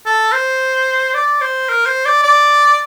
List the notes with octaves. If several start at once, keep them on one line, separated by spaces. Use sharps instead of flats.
A4
C5
D5
C5
A#4
C5
D5
D5